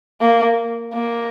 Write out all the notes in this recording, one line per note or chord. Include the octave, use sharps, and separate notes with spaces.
A#3
A#3